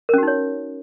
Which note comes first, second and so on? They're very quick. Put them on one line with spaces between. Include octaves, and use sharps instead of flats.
A#4 C#4 F#4 D#4 C#5